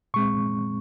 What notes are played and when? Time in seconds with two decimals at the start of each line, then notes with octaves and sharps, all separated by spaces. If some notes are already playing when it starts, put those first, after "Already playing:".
0.14 A#2 G#3 C4 C#6